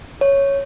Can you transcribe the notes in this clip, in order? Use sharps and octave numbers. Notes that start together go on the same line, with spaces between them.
C#5